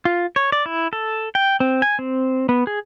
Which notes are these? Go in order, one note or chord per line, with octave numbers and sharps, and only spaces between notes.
F4
C#5
D5
E4
A4
G5
C4
G#5
C4
B3
G#4